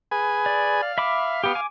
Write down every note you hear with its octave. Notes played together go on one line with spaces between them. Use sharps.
G#4 B4 G#5
D5
F5
E5 B5 D6
B3 G4
G#5 D6